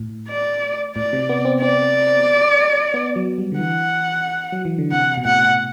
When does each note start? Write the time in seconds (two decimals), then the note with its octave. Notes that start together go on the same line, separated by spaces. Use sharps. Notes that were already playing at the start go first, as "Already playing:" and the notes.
Already playing: A2
0.29 D5
0.96 A2 D5
1.13 C3
1.29 B3
1.45 C4
1.62 C4 D5
2.94 B3
3.16 F#3
3.38 G3
3.52 D3
3.59 E3 F#5
4.52 F#3
4.65 E3
4.78 D3
4.92 C3 F#5
5.17 B2
5.25 A2 F#5